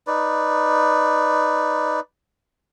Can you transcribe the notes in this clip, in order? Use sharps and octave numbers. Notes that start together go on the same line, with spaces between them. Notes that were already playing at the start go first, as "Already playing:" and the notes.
D#4 B4 D5